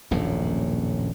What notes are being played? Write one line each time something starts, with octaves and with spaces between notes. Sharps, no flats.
D#1 A#1 F#2 A2